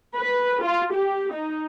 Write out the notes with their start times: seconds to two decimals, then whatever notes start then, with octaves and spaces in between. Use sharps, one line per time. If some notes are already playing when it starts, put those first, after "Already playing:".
0.17 B4
0.63 F4
0.94 G4
1.34 D#4